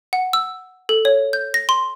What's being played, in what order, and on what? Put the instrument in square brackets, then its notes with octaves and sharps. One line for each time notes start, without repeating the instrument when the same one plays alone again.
[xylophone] F#5
E6
A4
C#5
G6
A#6
C6